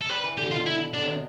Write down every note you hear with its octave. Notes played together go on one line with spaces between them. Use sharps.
A4
G3 B4
E3
D3 G4
B2 F4
E4
D3 D4
C3
B2